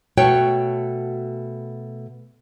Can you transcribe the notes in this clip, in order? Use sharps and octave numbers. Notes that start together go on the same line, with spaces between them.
B2 A3 F#4 C#5 G5